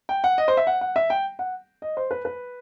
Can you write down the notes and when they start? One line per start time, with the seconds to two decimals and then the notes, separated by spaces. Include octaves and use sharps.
0.09 G5
0.24 F#5
0.38 D#5
0.48 C5
0.57 E5
0.67 F#5
0.81 F#5
0.96 E5
1.10 G5
1.39 F#5
1.82 D#5
1.97 C5
2.11 B4
2.25 B4